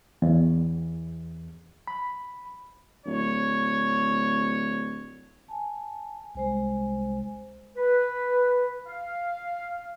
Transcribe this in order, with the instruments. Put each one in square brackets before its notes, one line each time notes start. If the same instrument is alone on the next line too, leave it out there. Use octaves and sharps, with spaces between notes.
[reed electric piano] E2
B5
[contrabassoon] D1 [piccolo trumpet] C#5
[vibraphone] G#5 A5
[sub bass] C2 [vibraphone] G#3 C5 G#5
[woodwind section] B4
F5